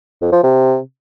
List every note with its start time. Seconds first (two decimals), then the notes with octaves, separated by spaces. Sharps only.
0.21 F2
0.32 F3
0.43 C3